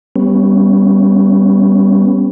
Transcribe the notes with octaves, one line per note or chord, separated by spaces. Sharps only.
G3 B3 C#4